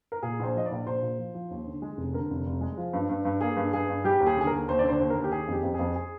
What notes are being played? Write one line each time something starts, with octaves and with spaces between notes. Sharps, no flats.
A#4
A#2 G#4
A#1 C5
F3 D#5
D5
A#1
A#1 C5
A#2
F3
F3
D#2
D3
G#3
F1
D3 A#4
F1
F1
G#3
F3
G2
G2
G2
A#3 G#4
G2
G2 G#4
G2
G3 G4
D#2
G#4
D3 G#4
A#4
D#2
D#2 C5
D3 D5
C5
D#2
A#4
D#2
G4
D#3 G#4
F2
G4
F2
G#4
F2
G#4